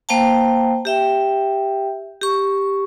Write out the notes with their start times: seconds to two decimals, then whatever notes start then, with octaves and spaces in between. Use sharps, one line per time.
0.09 A#3 C5 F5 G5 A5
0.85 G4 E5 G5
2.22 G4 C#6